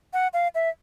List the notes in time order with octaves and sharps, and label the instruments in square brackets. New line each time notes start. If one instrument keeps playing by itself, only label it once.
[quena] F#5
F5
E5